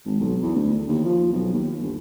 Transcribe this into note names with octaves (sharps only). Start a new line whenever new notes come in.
G#1
B1
E2
D2
D#2
F3
B1
D#2
G1